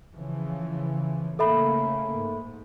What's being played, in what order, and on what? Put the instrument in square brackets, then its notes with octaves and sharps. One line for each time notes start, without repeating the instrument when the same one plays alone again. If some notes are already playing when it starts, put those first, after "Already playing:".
[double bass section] C#3 E3 F3
[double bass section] C#3 A3 A#3 [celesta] A4 E5 B5
[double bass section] G#2